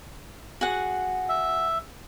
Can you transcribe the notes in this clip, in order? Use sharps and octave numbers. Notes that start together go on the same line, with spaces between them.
F#4 G#4 F#5
E5